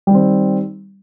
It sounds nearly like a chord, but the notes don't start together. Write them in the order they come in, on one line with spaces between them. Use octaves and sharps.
G3 D#3 C4